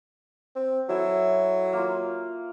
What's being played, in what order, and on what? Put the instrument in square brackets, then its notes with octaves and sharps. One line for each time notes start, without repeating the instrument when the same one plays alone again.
[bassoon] C4
[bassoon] F#3 [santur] E4 A4 E5
[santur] A#3 F4